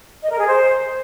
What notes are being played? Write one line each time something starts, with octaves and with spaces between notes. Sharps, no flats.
D#5
A#4
G#4
C5